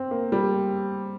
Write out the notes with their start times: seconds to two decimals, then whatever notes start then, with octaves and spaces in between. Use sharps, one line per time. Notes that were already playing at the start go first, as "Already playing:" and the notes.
Already playing: C4
0.11 A#3
0.32 G3